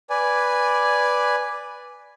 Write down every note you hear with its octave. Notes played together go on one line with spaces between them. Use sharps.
B4 D5 G#5